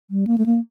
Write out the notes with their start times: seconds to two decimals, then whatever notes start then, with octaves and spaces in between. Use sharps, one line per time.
0.11 G3
0.27 A#3
0.38 A3
0.46 A#3